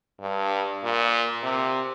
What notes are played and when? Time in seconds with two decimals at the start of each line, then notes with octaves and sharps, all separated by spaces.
0.20 G2
0.83 A#2
1.43 C3